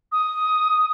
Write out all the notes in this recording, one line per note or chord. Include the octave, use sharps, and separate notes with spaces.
D#6